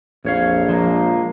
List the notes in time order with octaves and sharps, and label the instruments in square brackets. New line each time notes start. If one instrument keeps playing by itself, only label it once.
[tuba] A#1 [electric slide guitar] F2 C#5 F5
[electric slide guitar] F3 G#3 A#3